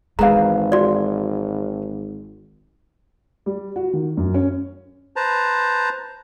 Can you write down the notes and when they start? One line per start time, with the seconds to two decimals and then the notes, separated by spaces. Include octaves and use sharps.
0.19 G#1 E3 G#3 G#4 B4 F5 A#5
0.72 F#4 D5
3.46 G3
3.76 F#4
3.93 D#3
4.17 F#2
4.34 C#4
5.16 B4 C5 A5 A#5